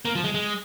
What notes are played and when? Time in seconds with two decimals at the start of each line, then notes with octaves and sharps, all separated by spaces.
0.05 A#3
0.15 F3
0.24 G#3
0.34 G#3